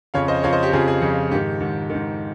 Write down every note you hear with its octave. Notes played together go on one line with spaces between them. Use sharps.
F2 C#3 F3 C#5 F5
C5 D#5
F2 C#3 F3 C#5 F5
C5 D#5
G4
F2 C#3 F3 G#4
G#4
F2 C#3 F3
G#2 D#3 G4
G#2 D#3
D#3
G#2